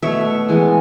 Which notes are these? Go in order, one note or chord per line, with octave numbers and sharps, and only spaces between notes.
B2 A3 C#5 E5
E3 G#3 B3